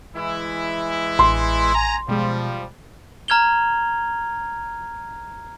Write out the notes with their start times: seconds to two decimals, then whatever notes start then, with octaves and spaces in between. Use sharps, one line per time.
0.16 E3 G#3 E4
1.19 A1 C6
1.74 G#5 A#5
2.08 B2 F3 G3 G#3
3.28 A#5 F6 G#6 F7 G7